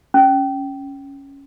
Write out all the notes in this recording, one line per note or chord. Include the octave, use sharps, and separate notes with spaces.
C#4